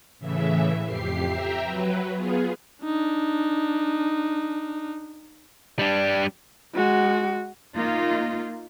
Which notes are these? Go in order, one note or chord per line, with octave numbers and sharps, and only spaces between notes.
A2 C#3 E3 E5
F2 G4 C7
E5 G5 A#5
F#3 B4
B3 F4 G#4
D4 D#4
G3 D4
G#3 F#4
A#3 D#4 F4